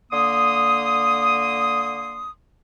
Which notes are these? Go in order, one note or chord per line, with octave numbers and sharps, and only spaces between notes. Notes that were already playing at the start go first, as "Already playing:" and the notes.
D3 A#3 C6 D#6